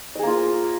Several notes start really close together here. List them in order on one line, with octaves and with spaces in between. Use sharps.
D#5 G#4 A#3 F4